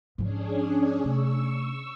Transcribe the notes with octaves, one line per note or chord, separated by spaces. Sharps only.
G#2 F3 C#4 D4 G#4
C3 A3 C#6 E6